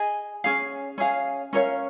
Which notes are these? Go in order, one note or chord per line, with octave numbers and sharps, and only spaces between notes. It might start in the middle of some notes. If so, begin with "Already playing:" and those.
Already playing: G#4 D#5 G#5
C#4 G#4 F5
C#4 G#4 F5
C#4 A#4 C#5 F5